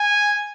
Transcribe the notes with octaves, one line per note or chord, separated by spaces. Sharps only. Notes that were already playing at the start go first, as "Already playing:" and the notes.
Already playing: G#5